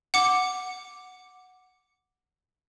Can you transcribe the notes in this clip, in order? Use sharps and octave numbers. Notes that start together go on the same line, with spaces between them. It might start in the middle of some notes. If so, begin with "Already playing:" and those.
F#5 D6